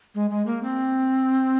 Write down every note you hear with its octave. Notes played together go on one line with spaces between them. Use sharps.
G#3
G#3
A#3
C4